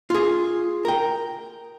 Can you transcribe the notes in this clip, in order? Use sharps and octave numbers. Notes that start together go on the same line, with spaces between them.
F4 G#4
A#4 G5